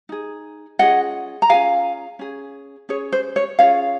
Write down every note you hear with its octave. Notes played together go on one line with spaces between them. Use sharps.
D#4 G#4
C#4 F4 G#4 D#5 F#5
A#5
C#4 F4 G#4 F5 G#5
C#4 G#4
C#4 G#4 C#5
C5
C#5
C#4 F4 G#4 C#5 F5